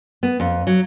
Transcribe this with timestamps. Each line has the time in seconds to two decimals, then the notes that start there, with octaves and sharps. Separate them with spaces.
0.23 B3
0.40 F2
0.67 F#3